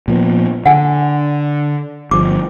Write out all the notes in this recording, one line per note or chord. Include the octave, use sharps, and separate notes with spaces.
A#2 F3 B3
D3 F#5 G#5
G1 F3 D6